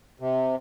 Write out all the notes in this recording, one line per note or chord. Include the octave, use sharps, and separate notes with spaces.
C3